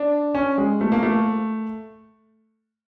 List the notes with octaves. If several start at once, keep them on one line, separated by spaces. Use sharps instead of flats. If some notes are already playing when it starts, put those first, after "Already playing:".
Already playing: D4
C#4
G#3
A3
A#3
A3